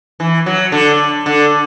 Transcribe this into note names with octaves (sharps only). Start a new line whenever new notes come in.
E3
F#3
D3
D3